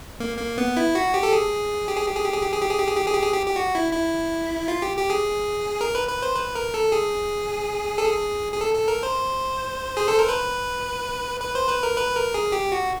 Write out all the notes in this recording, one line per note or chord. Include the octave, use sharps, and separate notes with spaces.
A#3
A#3
B3
E4
F#4
G4
A4
G#4
G4
G#4
G4
G#4
G4
G#4
G4
G#4
G4
G#4
G4
G#4
G4
G#4
G4
G#4
G4
G4
F#4
E4
E4
F4
G4
G4
G#4
A#4
B4
B4
C5
B4
A#4
A4
G#4
A4
G#4
G#4
A4
A4
A#4
C5
G#4
A4
A#4
B4
B4
C5
B4
A#4
B4
A#4
G#4
G4
F#4